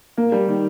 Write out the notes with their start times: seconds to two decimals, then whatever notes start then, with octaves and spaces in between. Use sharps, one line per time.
0.17 A#2 A#3
0.32 G3
0.48 D#3